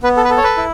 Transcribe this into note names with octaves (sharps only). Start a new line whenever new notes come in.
B3 B4
A4
B4
A4
C#5
B4
E4